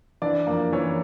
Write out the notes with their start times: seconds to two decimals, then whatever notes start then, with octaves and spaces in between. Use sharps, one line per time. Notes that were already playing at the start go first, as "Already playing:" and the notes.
0.22 E3 D4 D5
0.47 F2 A#3 A#4
0.72 E3 C#4 C#5